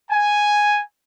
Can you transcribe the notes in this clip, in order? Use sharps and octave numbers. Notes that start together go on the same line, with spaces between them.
G#5